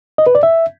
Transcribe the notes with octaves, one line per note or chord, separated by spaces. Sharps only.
D#5
B4
D5
E5